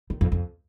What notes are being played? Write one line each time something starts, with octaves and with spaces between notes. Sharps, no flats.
D#3
F2
F2